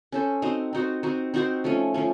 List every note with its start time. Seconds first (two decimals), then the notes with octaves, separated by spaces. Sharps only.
0.12 C#4 A4 C5
0.42 C4 D#4 F#4 C5
0.73 C4 D#4 F#4 C5
1.03 C4 D#4 F#4 C5
1.34 C4 D#4 F#4 C5
1.64 F3 A3 C#4
1.94 F3 A3 C#4